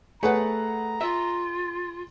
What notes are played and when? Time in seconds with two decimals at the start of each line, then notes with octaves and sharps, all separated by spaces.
0.23 A3 G#4 B4 C#5 F#5 A#5
1.01 F4 E5